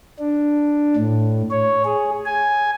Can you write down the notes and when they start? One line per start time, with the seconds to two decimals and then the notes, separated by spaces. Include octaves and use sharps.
0.19 D4
0.96 A2
1.51 C#5
1.85 G#4
2.26 G#5